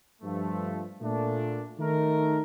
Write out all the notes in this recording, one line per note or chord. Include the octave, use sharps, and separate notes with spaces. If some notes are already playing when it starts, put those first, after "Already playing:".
G2 F3 A3
A#2 A3 D4
D#3 A3 D#4 A#4